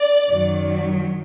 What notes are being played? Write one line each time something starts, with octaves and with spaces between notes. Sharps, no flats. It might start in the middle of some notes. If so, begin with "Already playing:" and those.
Already playing: D5
F#2 D#3 F#3